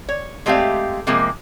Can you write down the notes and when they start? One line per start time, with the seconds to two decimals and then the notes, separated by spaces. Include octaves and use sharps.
0.09 C#5
0.46 G#3 A3 C4 G4 E5 F5
1.07 C3 F3 G#3 A#3